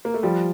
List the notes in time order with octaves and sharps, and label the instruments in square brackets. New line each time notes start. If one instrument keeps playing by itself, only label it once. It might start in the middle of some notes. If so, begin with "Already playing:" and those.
[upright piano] A#3
A3
[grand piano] F3 [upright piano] G3